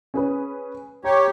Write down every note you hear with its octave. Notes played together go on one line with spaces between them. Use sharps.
C#4 G#4 B4
G4 C#5 A#5